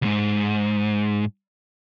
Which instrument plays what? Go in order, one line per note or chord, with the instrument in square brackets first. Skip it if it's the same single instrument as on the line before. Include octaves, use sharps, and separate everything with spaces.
[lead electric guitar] C#2 G#2